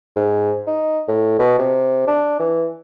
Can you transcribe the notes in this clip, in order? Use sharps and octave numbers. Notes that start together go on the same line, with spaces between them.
G#2
D#4
A2
B2
C3
D4
E3